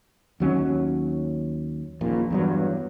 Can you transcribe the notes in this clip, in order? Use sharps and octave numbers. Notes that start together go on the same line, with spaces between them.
D#2 F#3 C#4
D#1 A#1 A#2
E2 G2 F#3